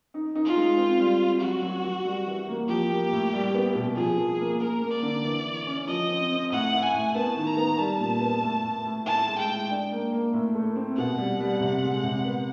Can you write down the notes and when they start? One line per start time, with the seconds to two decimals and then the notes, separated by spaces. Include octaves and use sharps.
0.14 D#4
0.35 D#4
0.45 F4
0.56 G#3
0.77 C4
0.99 G3
1.20 C4
1.41 F#3 F#4
1.62 F#3
1.84 F#3
2.05 G3
2.27 E3
2.48 A#3
2.68 F3 G4
2.90 A#3
3.12 A2
3.33 G3
3.54 B3
3.75 B2
3.96 F3 G#4
4.18 F3
4.39 A#3
4.60 A#3 A#4
4.81 A#3
4.91 D5
5.03 D3
5.24 E3
5.45 E4
5.67 C#4
5.88 F3 D#5
6.09 C4
6.31 C4
6.52 A2 F#5
6.73 E4
6.83 G#5
6.94 A2
7.15 B3 A5
7.37 D#3
7.47 A#5
7.57 B3
7.78 G3 A5
8.00 A#2
8.21 B3
8.42 A2
8.63 A2
8.84 A2
9.06 E4 A5
9.28 G#3
9.38 G5
9.49 G#3
9.70 D4
9.91 A#3
10.12 A#3
10.33 A2
10.55 A3
10.76 C4
10.97 B2 F#5
11.18 G3
11.40 G3
11.61 C3
11.83 G#3
12.04 C3
12.25 B3